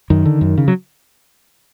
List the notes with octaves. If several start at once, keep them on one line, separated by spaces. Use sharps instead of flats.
F#2 D#3
D3
F#2
C#3
F#3